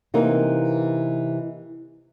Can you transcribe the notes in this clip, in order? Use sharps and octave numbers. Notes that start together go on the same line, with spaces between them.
C3 E3 A#3 D#4